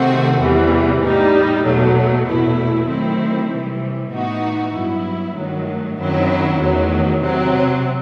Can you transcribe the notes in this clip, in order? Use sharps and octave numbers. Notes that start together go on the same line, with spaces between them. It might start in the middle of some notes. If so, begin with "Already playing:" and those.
Already playing: C3 D#3 A3 C4 F#4
E2 C3 E3 G3
A2 G3 D#4
E2 B2 F#3 A3
E2 B2 A3 E4
D#3 F#3 A3 C4 E4
C3 E3 G3
A2 E3 B3 D#4 F#4
G2 F#3 B3 E4
G2 D#3 F#3 A3
F#2 D#3 F#3 C4 E4
E2 D#3 F#3 A3
C3 F#3 C4